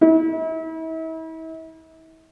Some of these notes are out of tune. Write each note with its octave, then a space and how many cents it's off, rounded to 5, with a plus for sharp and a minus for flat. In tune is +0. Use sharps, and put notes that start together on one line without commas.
E4 -40